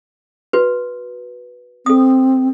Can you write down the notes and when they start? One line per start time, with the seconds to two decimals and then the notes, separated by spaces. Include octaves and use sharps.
0.53 F#4 B4
1.86 C4 A4 D#6